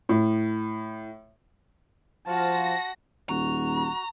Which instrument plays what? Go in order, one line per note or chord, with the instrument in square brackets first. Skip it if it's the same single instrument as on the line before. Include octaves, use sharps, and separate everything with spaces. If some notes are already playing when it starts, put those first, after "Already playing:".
[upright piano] A2
[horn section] F3 F4 [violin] F#4 [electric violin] A5 [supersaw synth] A#6
[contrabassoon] D#1 [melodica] F#4 [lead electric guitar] A#5